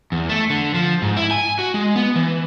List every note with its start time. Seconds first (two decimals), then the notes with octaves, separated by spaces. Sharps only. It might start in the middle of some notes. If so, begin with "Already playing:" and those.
0.12 E2
0.29 A3
0.50 D3
0.74 F3
1.02 G#2
1.17 E4
1.31 G#5
1.59 F#4
1.74 G#3
1.96 B3
2.16 E3